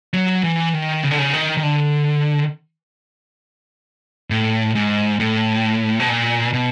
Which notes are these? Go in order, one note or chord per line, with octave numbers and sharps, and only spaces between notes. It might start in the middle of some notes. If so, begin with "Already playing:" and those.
F#3
E3
D#3
C#3
D3
C#3
D#3
D#3
D3
A2
G#2
A2
B2
A#2
B2